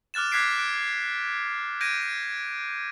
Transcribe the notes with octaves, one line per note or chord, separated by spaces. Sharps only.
D6 F6 F#6 A6 E7
D6 F#6 G#6 B6 C7 D7
F#6 D7
G6 G#6 A#6 D7 D#7